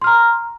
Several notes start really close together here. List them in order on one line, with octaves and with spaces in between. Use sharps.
C6 F6 A#5